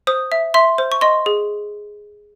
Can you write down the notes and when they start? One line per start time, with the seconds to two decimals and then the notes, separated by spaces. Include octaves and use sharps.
0.07 C5 D#6
0.32 E5
0.54 E5 C6
0.78 C5
0.92 C#6
1.01 D#5 C6
1.26 G#4